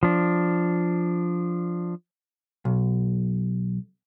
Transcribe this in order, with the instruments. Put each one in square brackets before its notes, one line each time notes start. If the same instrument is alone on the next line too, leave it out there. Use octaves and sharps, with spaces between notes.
[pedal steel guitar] F3 D4
[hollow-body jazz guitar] B1